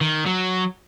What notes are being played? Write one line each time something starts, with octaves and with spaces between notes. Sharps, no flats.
D#3
F#3